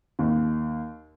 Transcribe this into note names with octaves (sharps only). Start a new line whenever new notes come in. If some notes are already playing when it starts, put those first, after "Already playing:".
D#2